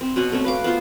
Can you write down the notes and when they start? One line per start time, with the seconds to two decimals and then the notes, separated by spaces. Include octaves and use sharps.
0.01 C4
0.16 B2 C#4 F#5 G#5
0.32 A3 C4 C#4
0.44 B4 F5 D6
0.64 B3 F4 C5